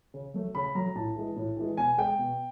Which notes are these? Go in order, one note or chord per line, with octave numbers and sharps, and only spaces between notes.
C#3
F#3 A3
C#3 B5
F#3 A3 A#5
A2 A5
E3 G#3
A2
E3 G#3
B2 G#5
G#3 G5
B2